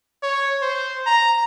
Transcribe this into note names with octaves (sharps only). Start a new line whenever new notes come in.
C#5
C5
A#5